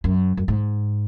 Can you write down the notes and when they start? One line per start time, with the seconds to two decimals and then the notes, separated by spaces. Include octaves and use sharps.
0.04 F#2
0.37 F#2
0.48 G#2